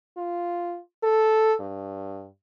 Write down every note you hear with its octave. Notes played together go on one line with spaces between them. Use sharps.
F4
A4
G2